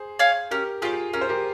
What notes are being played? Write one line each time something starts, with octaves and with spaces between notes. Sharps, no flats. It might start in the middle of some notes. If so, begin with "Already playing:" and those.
Already playing: G#4 C5
C#5 F5 G#5
C#4 G4 A#4
F4 G4 G#4 C#5
C#4 A#4
C5
G4 A#4